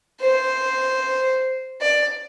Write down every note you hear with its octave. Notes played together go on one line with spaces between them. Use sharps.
C5
D5